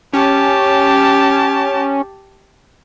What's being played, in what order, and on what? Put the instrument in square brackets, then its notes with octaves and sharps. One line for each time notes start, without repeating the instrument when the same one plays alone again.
[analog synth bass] C#4 [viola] G4 A5